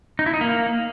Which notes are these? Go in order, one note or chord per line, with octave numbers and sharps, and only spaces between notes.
D#4
E4
D#4
A#3